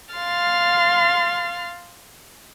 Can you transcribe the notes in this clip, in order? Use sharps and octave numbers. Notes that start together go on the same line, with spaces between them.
F5 C6 F6 A6